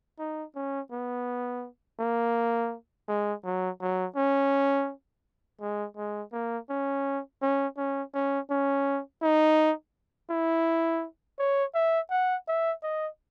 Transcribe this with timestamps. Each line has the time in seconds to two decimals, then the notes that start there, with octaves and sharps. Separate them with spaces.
0.19 D#4
0.55 C#4
0.91 B3
2.00 A#3
3.08 G#3
3.45 F#3
3.81 F#3
4.16 C#4
5.61 G#3
5.97 G#3
6.33 A#3
6.69 C#4
7.42 C#4
7.77 C#4
8.14 C#4
8.50 C#4
9.22 D#4
10.30 E4
11.39 C#5
11.75 E5
12.10 F#5
12.48 E5
12.83 D#5